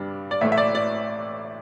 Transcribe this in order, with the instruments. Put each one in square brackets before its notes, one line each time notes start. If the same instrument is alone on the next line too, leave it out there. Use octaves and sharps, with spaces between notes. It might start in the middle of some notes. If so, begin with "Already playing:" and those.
Already playing: [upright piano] G2 G3 D4
D5
A1 A2 A3 E5
E5
D5
D5